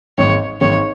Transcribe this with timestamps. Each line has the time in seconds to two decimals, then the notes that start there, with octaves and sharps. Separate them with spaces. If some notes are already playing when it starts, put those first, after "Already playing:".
0.18 G#1 G#2 D#3 C#5
0.61 G#1 G#2 D#3 C#5